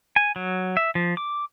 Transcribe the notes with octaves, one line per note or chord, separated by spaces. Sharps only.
G#5
F#3
E5
F3
D6